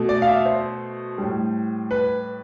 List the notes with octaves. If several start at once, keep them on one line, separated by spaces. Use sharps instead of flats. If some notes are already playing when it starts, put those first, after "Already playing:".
Already playing: B2 A3
D5
F5
E5
C5
A2 G3
B4